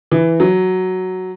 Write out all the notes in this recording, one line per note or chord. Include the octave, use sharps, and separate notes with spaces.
E3
F#3